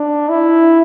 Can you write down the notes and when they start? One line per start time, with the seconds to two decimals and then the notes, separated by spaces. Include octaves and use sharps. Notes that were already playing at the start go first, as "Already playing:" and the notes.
Already playing: D4
0.29 E4